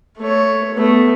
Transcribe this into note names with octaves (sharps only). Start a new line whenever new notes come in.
A3 C#5
A3 B3